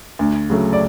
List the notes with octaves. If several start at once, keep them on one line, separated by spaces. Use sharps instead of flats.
D2
C#3 F#3 A3
D5